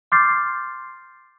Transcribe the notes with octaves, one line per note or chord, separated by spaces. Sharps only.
C6 D6 F6 G6 A6 C7